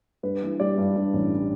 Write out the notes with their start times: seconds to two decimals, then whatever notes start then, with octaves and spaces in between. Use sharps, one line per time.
0.23 G2 B4
0.42 E3
0.60 G3 D5
0.78 G2
0.96 G2
1.13 A1